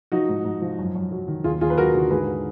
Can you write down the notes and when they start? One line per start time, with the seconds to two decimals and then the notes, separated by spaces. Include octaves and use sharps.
0.12 F3 D#4 F#4
0.29 G#2
0.45 G#2
0.62 F3
0.79 F#2
0.95 F#2
1.11 F#3
1.28 D#3
1.44 D#2 F4 G#4
1.61 D#2 F4 G#4
1.70 B4
1.78 F#3 F#4 A#4
1.94 D3 F#4 A#4
2.10 G#2 G#4 B4